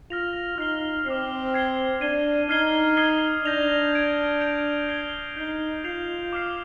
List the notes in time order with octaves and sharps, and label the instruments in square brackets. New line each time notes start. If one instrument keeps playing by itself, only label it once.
[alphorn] F4 [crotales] F6 A#6 F7
[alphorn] D#4 [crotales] F6 C7 G7
[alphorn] C4 [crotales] D6 F6 C7
[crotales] G#6 C7 G7
[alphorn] D4 [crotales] G#6 C7 D#7 G7
[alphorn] D#4 [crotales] F6 G#6 C7 G7
[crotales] D#6 G#6 C7 G7
[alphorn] D4 [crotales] G6 A#6 F7
[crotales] G#6 D7 F7
G6 D7 F7
G#6 C7 G7
[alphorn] D#4 [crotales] G6 C7 G7
[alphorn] F4 [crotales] G6 C7 F7
[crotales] D6 F6 C7